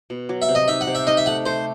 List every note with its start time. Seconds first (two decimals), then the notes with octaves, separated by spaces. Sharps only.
0.10 B2
0.29 F#3
0.42 E5
0.49 C3
0.55 D#5
0.68 D#4 E5
0.81 F#5
0.87 C3
0.95 E5
1.07 D#4 D#5
1.17 E5
1.26 A3 F#5
1.46 A3 C5